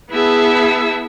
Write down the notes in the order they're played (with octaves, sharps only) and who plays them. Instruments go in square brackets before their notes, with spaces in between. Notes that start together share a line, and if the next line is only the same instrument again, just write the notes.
[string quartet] B3 E4 G#4 E5 A5